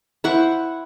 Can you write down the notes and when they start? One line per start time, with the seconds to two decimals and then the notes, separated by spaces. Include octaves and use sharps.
0.24 E4 C5 F#5 C#6